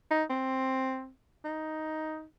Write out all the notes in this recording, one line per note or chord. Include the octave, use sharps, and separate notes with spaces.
D#4
C4
D#4